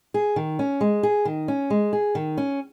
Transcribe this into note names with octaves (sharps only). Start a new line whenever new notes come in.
G#4
D#3
C#4
G#3
G#4
D#3
C#4
G#3
G#4
D#3
C#4